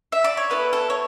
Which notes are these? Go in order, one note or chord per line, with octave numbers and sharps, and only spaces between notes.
E5
D5
C#5
B3 E4 A4 B4
A4
C#5